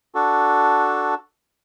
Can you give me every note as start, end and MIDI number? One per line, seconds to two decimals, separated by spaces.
0.15 1.15 62
0.15 1.15 66
0.15 1.15 69